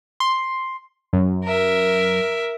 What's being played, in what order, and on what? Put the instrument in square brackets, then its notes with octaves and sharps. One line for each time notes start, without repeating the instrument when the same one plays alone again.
[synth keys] C6
F#2
[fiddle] A#4 E5